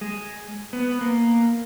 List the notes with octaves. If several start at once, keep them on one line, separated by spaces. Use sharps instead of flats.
G#3
B3
A#3